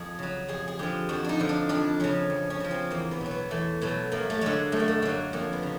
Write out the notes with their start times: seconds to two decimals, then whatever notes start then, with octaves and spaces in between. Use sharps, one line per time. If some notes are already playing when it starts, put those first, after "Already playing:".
Already playing: F2 G#4
0.19 C#3 F#3
0.48 F2 G#4
0.68 G#4
0.79 D3 F3 G4
1.09 F2 F#4
1.24 D4 D#4
1.39 D3 F3
1.49 D4
1.69 F2 D4
2.00 C#3 F3 C#4
2.30 F2
2.50 C#4
2.60 C#3 F3
2.71 C4
2.91 E2 A#3
3.11 B3
3.21 B2 F#3
3.31 B3
3.51 E2 A3
3.82 B2 F#3 A3
4.12 F#2 A#3
4.30 A3
4.41 D3 F#3 G#3
4.72 F#2 A3
4.80 A#3
4.88 A3
5.02 D3 F#3 A#3
5.33 F2 A#3
5.53 B3
5.63 C#3